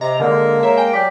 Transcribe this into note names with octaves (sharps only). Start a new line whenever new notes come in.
C3 D#5 A#5
D3 G#3 A#3
C#5 E5 A#5
G5 G#5
F#3 G4 D5 B6